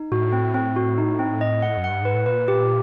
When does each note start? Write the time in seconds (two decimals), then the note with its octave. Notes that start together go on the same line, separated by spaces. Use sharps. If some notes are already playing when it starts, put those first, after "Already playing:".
Already playing: D#4
0.12 A2 F#4
0.33 C4
0.54 C4
0.76 F#4
0.98 D#4
1.19 C4
1.41 D#5
1.62 F#5
1.77 F#2
1.84 F#5
1.90 G2
2.02 G#2 B4
2.14 A2
2.26 A#2 B4
2.48 G4